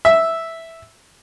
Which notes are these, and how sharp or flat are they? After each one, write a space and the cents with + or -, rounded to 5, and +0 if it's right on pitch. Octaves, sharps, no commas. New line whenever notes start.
E5 -5